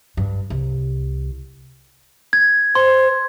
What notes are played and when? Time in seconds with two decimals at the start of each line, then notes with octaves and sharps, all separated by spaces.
0.17 G2
0.50 C2
2.33 G#6
2.75 C5 C6